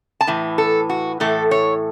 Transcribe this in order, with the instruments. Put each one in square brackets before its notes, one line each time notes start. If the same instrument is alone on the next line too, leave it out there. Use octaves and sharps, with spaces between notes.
[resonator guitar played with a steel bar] A5
A2 E3
A4
F#4
A2 E3 A3 A4
C#5